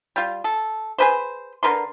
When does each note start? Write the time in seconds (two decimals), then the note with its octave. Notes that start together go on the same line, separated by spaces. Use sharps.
0.16 G3 F4
0.44 A4
0.98 G#4 B4 C5
1.63 D3 A#4 B4 C6